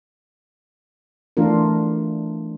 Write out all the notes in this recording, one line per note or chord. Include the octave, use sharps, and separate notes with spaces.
E3 A3 D4 F4 A#4